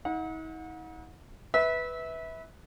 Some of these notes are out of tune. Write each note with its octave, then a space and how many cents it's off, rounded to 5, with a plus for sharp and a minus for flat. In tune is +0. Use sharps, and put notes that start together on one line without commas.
D#4 +45 F#5 -30
B4 +0 E5 -25